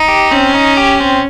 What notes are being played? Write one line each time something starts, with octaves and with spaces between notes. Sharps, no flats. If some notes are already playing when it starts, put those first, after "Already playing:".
Already playing: D#4
G4
C4 C#4
D#4
G4
C4